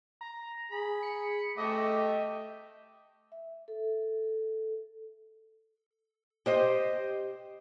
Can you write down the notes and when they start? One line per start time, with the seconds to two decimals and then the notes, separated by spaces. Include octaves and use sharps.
0.21 A#5
0.72 G#4 B5
1.03 C#7
1.58 A3 D#5 E5 G5 D6
3.32 E5
3.68 A4
6.46 G4 C5 D#5